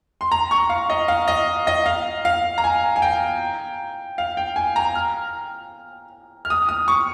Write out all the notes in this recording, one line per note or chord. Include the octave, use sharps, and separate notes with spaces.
C6
A#5
C#6
F5
D#5
F5
D#5
D#5
F5
F5
A#5
G#5
G#5
G5
F5
G5
G#5
A#5
F6
F6
D#6
D#6
C#6